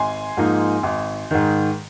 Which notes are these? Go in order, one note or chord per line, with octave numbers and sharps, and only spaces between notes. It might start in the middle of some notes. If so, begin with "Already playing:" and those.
Already playing: G#1 G#5 C6
G#2 F3 A#3 D#4
G#1
G#2 D#3